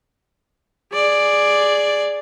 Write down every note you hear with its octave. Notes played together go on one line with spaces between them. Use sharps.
G#4 D5